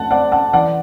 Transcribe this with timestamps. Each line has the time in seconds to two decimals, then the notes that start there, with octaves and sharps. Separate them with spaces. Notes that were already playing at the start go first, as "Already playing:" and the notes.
Already playing: A3 F#5 A5
0.11 C4 D5 F#5
0.32 F#5 A5
0.53 E3 D5 F#5